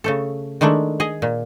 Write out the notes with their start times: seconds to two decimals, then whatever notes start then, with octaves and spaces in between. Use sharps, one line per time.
0.04 C#3 A3 A4
0.61 D#3 G#3 A3 D4 E4
1.00 G#4 D#5
1.22 A#2